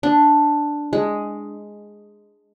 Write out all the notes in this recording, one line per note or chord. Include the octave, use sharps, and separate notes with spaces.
D4
G#3